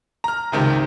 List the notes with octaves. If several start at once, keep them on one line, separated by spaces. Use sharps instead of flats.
A#5 F6
G#1 C#2 C3 D#3